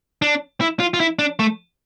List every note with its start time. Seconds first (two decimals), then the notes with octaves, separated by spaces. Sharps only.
0.22 D4
0.61 E4
0.80 F4
0.94 F4
1.00 E4
1.19 D4
1.39 A3